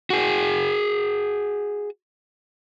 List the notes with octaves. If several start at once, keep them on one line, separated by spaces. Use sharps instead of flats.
F#4 G#4